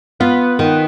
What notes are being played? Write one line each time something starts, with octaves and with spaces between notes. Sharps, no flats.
B3 F4 B4
D#3